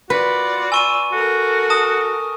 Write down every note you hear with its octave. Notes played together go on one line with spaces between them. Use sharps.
F4 F#4 B4 D5
G#5 C#6 E6 D#7
F#4 A4 A#4
A5 D#6